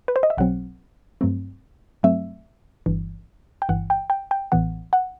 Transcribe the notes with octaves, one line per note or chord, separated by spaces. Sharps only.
B4
C5
D#5
E5
B1 B2 F#3 C4 F#5
G2 F#3 A3 C4
G2 F#3 A3 C4 E5
G1 G2 E3
G5
G1 G2 E3 F#5
G5
G5
G5
A1 A2 E3 B3 F#5
F#5